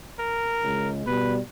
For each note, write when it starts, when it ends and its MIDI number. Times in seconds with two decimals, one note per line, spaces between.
0.19 0.91 70
0.63 1.06 37
0.63 1.06 56
1.07 1.38 47
1.07 1.38 55
1.07 1.35 71